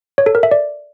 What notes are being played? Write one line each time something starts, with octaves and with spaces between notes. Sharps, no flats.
C#5
A4
A#4
E5
D5